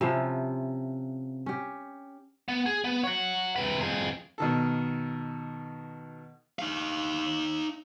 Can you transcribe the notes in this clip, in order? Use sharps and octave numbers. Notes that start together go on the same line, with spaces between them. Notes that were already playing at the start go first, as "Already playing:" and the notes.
C3 F3 C#4 E4
C#4 G4
B3
G#4
B3
C#5 F#5
C3 B4
F2 G#4
B2 D#3 A4
D#4 F5